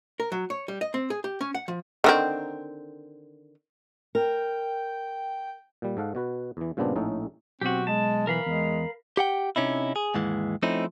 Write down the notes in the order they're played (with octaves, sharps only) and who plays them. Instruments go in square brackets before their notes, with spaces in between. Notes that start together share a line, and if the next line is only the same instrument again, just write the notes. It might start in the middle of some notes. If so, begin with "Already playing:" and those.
[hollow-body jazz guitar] A#4
F#3
C#5
G3
D#5
C4
G#4
G4
C#4
F#5
F3
[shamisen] D3 D#3 C4
[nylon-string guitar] A#4 [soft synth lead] G5
[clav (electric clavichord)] A#2 G3
G#2 A4 F5 F#5
B2 F#4 B4
E2 E3
G2 A#2 C#3 B3 C4 D4
A#1 A2 C#4 D#4 A4
[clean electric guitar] B1 [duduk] C4 [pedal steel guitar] F#4 G4
[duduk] G#3 [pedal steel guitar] A5
[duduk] E3 [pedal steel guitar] A#4 F5 B5
[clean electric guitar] E2 [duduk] G#3
[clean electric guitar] G4 F#5 G5
C3 C#4 D#4 E4
G#4
D#2 G#2 E3 G#3
F3 A3 C4 C#4 D#4 E4